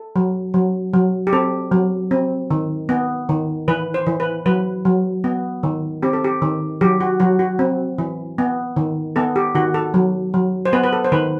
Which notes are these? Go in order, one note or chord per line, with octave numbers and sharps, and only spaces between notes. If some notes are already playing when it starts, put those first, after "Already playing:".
Already playing: A4
F#3
F#3
F#3
G4
C4 A4
F#3
C4
D#3
B3
D#3
E3 B4
C5
E3
B4
F#3 B4
F#3
B3
D#3
C4 G4
A4
G4
D#3
F#3 G4
F#4
F#3 F#4
F#4
C4
E3
B3
D#3
B3 A4
G4
D#3 F#4
A4
F#3
F#3
C5
B3 B4
B4
A4
C5
D#3 B4